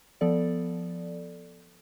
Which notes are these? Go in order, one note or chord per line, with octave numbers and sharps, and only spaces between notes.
F3 B3 A4 D5